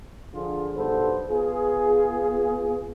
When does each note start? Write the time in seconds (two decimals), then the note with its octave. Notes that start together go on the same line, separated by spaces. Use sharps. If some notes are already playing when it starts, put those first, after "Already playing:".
0.34 D3 F3 F4 G#4
0.75 B1 G2 B3 A4 C5
1.29 B3 F4 G#4